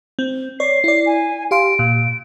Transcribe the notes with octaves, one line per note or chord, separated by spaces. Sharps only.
C4
C#5 D5 C7
E4 D5
G#5
G4 F5 C6 D7
A#2